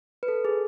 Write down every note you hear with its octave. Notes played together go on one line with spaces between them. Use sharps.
B4
A4
G#4